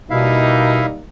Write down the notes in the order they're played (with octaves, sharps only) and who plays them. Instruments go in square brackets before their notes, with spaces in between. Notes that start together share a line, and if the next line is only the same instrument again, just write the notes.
[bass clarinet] B2 [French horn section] G3 A#3 D#4 [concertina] E4 E5 F5